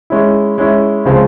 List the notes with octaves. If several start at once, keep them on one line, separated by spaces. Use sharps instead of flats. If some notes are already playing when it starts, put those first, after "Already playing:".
G#3 C#4 E4
G#3 C#4 E4
C#3 F3 G#3 C4 F4